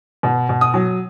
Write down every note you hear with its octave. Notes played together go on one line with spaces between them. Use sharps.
B2
B2
D#6
F#3